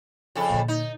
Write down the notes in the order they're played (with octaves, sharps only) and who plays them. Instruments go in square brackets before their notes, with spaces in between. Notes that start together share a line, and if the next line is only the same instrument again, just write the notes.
[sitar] F2 C#3 A4
[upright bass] A#2 D3
[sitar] D#4